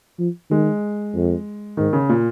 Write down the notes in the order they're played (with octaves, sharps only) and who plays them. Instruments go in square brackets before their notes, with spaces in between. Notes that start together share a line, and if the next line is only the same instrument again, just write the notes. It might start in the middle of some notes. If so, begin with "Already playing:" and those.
[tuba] F3
[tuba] D#3 [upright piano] G#3
[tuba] F2
[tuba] G#2 [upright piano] D#3
[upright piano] C#3
A#2